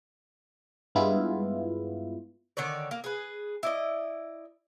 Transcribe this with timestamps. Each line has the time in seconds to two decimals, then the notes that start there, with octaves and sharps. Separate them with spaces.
0.95 G2 G#3 B3 E4 F4
2.57 D3 D#3 C#5 D5
2.91 A#3
3.04 G#4 B4
3.63 E4 D5 D#5